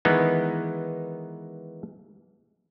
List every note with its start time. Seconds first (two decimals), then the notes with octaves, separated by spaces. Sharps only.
0.05 D#3 E3 G#3 B3 D#4